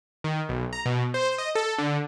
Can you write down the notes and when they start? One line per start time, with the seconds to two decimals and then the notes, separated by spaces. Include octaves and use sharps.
0.24 D#3
0.49 B1
0.73 A#5
0.86 B2
1.14 C5
1.38 D#5
1.55 A4
1.78 D3